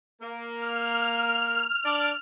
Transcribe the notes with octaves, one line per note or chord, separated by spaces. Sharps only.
A#3
F6
D4 D5